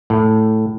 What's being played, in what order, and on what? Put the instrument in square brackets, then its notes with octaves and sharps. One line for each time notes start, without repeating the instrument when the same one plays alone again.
[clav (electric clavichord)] A2